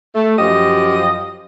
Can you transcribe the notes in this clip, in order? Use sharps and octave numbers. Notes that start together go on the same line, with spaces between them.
A3
F#2 F3 G4 D#5